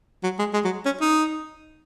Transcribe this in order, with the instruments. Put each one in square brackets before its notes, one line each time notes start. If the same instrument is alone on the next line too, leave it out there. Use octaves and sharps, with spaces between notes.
[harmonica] F#3
G#3
G#3
F#3
C#4
D#4